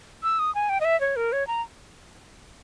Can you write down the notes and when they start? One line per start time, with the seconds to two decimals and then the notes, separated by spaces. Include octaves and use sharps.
0.23 E6
0.39 D#6
0.55 G#5
0.69 G5
0.81 D#5
0.85 E5
1.01 C#5
1.16 A#4
1.33 C#5
1.47 A#5